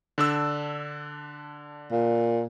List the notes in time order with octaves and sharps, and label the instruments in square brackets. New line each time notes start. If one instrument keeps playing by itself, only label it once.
[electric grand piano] D3 D4 E6
[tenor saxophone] A#2